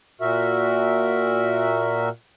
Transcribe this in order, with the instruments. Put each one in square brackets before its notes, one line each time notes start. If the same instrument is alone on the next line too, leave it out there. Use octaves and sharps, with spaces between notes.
[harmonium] A#2 F#4 A#4 E5